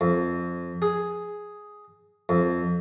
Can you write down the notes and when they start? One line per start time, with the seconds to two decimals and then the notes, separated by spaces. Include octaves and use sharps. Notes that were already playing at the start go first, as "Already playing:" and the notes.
0.01 F2
0.82 G#4
2.29 F2